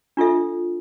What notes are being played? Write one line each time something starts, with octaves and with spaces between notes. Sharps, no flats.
D4 F4 A4 E5